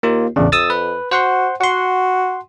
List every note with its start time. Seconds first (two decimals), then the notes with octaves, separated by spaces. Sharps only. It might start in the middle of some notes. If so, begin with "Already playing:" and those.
0.03 D#2 A#3 F4
0.36 A1 E2 C#3 D4
0.52 F2 D#6 E6 A6
0.70 B4
1.11 F#4 C5 F#5 C6
1.61 F#4 F#5 C6